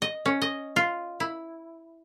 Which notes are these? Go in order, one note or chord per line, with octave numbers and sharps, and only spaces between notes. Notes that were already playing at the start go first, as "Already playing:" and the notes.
D#5
C#4
D#5
F4
E4